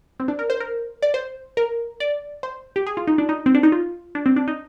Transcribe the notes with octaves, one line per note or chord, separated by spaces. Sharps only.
C4
D4
A#4
C5
A#4
D5
C5
A#4
D5
C5
G4
G#4
F4
D#4
D4
D#4
C4
D4
D#4
F4
D4
C4
D4
D#4